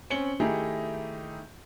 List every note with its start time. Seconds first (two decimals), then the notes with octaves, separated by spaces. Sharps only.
0.10 C4 C#4 C#7 F#7 G7
0.40 D#3 A3 D#4 E4 G4 G#4